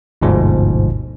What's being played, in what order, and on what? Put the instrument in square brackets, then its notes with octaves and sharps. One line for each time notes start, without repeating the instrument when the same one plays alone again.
[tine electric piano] G1 D2 G#2 B2 F3